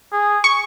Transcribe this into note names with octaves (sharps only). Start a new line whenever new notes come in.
G#4
C#6